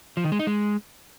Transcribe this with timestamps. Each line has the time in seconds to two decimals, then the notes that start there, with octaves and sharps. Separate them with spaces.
0.17 F3
0.24 D#3
0.32 G#3
0.39 D#4
0.47 G#3